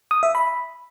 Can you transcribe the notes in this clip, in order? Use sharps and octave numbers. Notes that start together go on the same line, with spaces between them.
D#6
E5
B5